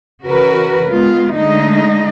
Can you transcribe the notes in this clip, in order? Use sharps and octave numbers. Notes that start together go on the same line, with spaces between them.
C#3 E3 F#4 A#4 B4
G#3 B3 F4
D3 G#3 A3 D#4 D#5